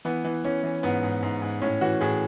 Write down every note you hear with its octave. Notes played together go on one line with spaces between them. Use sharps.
E3 B3
E3
E3 C#4
E3
G#2 B3
G#2
G#2
G#2
A2 C#4
E3 F#4
A2 G#4